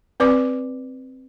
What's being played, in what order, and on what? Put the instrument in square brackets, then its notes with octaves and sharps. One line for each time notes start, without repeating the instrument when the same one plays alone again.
[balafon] C4 B4 D5 D6